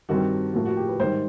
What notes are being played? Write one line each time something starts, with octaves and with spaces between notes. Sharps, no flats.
G2 D#3 G3 C4 F#4
A2 F3 A#3 F#4
F#4
G4
B4
G#2 D#3 G3 C5